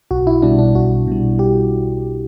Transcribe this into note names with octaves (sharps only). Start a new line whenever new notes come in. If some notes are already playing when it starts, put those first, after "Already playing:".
B1 F#4
E4
B2 G3 D4
D4
B1 F#4
B2 G3
G4